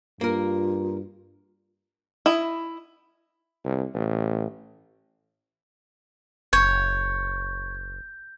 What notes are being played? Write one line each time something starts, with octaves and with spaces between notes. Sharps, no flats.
G2 A#3 F4 A#4
E4 D#5
C2
A1
F#1 C#5 G6